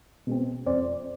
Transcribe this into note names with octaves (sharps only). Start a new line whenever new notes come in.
B2 G#3 C4
F2 C5 D5